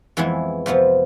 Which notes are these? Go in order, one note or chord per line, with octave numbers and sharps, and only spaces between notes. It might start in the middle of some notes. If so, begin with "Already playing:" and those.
F2 E3 G#3 B3 E4
F2 C3 F3 B3